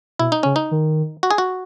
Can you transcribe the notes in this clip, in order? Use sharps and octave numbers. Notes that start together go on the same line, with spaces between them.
B2 E4
D#4
C#3 C#4
D#4
D#3
F#4
G#4
F#4